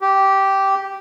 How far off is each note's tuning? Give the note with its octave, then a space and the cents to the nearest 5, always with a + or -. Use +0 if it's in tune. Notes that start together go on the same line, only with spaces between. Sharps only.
G4 -10